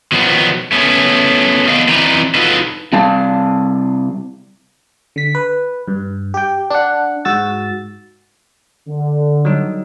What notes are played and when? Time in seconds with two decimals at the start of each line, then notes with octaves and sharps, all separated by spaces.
0.12 B2 D#3 F3 F#3 A#3 B3
0.72 A3 B3 C#4
1.68 B3 D4 D#5 F5
1.88 E3 C4 D#4 B4 D5 A#5
2.35 D#4 F4 F#4 A4 B4 D#5
2.93 C3 G3 D5 F5 A5
5.16 D3 B6
5.35 B4
5.88 G2
6.34 G4 G5
6.70 D4 F#5
7.25 G#2 F#4 E6 A6
8.88 D3
9.45 F#3 G3 D#4